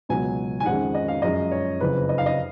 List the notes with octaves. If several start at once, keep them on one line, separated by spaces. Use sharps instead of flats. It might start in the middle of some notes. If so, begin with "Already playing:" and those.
C#2 B2 F#3 G#5
G#5
F2 D#3 G#3 C#4 F#5
D#5
F5
F#2 F3 G#3 C#4 D#5
C#5
F#1 F2 C#3 B4
D#5
F5
D#5